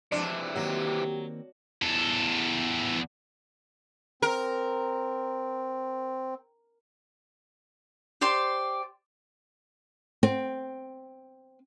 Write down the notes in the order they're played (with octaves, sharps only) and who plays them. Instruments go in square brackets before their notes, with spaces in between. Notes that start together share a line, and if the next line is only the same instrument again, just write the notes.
[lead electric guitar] C3 E3 [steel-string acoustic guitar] F3 G#3 [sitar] D4
[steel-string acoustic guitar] D#3 A#3 C4 [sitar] F#3 [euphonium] G4
[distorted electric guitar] E2 A4
[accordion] C4 [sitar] A#4
[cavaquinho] G4 C5 D5 C6
[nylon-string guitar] C4